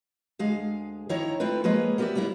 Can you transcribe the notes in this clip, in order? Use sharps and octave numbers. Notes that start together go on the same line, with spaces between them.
D2 G#3 G#4 F5
F2 D#3 F3 E4 C#5 A#5
A3 C4 E4 F4 B4
F3 G#3 A#3 G#4 B4 C#5
B3 G4 A#4 B4 D5 E5
F#3 G3 A#3 B3 E4